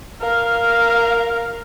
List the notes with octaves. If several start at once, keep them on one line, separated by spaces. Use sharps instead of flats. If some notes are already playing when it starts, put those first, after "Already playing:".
A#4 F5